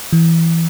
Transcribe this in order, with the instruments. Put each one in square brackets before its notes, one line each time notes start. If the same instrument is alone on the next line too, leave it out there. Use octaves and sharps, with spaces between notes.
[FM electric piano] E3